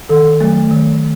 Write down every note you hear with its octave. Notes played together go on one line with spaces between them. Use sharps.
D#3 A4
F#3 A3
D#3